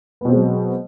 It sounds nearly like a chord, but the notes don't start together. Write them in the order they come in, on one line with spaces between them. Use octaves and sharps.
B3 B2 C4 G#3 F#3